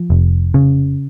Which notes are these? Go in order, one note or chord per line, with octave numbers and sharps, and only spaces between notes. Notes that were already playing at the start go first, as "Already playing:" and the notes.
Already playing: F3
F1
C#3